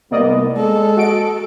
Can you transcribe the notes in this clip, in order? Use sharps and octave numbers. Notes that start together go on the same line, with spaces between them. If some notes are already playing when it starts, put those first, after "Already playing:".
C2 G#2 A#3 B3 D5 D#5
G#3 A4
F#4 D#5 D7